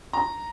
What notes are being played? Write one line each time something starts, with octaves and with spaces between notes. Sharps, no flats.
A#5